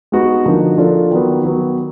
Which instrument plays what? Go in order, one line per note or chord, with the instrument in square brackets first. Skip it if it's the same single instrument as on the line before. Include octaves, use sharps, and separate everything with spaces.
[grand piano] G#3 B3 D#4 F#4
D3 F3 A#3 D#4 F#4
F3 A#3 D4 F4 A4
D#3 F#3 B3
D#3 F#3 B3